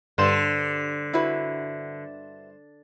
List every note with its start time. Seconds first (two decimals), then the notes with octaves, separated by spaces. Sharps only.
0.18 G2 D3 C5 E7
1.13 E4 F#4 B4